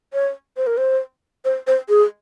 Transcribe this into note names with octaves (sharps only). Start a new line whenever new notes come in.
C#5
C5
A#4
C5
C5
C5
G#4